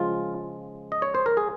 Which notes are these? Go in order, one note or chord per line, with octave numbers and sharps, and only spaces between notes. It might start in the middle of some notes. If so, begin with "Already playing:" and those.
Already playing: C#3 F3 G#3 F4
D#5
C#5
C5
A#4
G#4